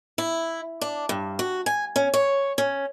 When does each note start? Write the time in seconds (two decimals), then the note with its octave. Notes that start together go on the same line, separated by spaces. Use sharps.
0.18 E4
0.81 D4
1.09 G2
1.39 F#4
1.66 G#5
1.96 C#4
2.14 C#5
2.58 C#4